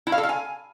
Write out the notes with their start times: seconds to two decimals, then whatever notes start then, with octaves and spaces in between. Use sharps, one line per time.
0.07 E4
0.12 F5
0.18 A4
0.23 F5
0.29 G#5